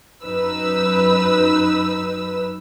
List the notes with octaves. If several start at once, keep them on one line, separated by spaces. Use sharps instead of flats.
F#2 D#4 B4 E6